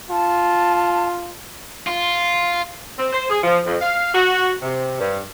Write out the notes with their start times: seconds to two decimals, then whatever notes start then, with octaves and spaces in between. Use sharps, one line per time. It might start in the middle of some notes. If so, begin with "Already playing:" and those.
0.10 F4 A5
1.87 F4
2.98 C4
3.12 C5
3.29 G#4
3.44 F3
3.66 F2
3.81 F5
4.14 F#4
4.62 C3
4.99 G2